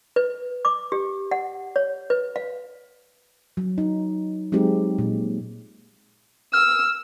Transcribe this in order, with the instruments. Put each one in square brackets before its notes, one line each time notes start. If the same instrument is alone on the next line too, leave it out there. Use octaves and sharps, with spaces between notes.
[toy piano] B4
D6
G4
F#5
C#5
B4
F5
[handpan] F#3
D#4
F#3 G#3 C4 D#4 G4
A#2
[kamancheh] E6 [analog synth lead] F6